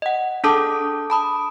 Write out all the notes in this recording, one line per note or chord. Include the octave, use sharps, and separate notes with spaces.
D#5 F#5
D4 G#4 A4 A5 D6 D#6
A5 B5 D#6